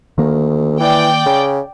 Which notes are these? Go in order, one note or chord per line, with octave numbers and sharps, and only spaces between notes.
D2 D#3 A#3
E3 D5 G5
C#3